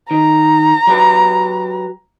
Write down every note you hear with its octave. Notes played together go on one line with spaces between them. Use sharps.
D#3 A#5
F#3 G4 B4